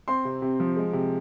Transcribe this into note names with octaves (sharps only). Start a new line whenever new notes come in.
C4 C6
C3
C3
F3
G#3
C3